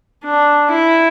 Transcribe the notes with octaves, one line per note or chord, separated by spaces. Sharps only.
D4
E4